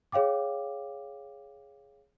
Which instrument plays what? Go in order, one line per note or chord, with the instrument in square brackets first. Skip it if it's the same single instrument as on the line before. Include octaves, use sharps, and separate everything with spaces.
[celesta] G#4 C#5 F5 G5 D6